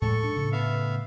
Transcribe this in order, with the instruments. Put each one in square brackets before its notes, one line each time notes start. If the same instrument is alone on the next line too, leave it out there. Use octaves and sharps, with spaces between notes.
[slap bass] A2 F3 G#3 [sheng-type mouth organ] A4 C#6
[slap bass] D4
A2 C#3
[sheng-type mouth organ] B3 E5 F5